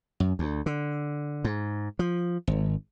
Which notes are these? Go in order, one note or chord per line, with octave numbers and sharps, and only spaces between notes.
F#2
D2
D3
G#2
F3
G#1